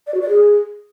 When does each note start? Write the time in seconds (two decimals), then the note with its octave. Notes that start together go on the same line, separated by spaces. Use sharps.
0.07 D5
0.14 F#4
0.22 D5
0.29 G#4